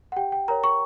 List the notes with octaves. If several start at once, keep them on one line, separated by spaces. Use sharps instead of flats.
F#5
G4 G5
G5
A#4 C#5 A#5
C#6